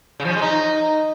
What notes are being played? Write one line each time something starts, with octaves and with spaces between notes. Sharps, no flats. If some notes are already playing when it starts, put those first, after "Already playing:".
C#3
F3
C#4
G#3
D#4